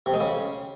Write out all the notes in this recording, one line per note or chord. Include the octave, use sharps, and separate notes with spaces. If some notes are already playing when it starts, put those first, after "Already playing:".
C3
G#3
C#3